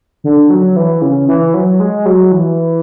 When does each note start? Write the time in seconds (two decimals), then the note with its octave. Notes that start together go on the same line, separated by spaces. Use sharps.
0.24 D3
0.50 F#3
0.76 E3
1.02 C#3
1.28 E3
1.54 F#3
1.80 G#3
2.06 F#3
2.32 E3